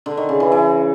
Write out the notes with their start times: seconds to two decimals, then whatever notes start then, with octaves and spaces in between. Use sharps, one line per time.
0.06 D3
0.17 D#3
0.29 C#3
0.40 E3
0.52 E3